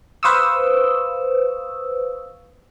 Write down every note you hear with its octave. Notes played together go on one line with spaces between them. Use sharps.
B4 C5 F5 C#6 D#6 E6